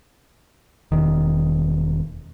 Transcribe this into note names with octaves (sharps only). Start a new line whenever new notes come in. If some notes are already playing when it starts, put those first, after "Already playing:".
E1 D#3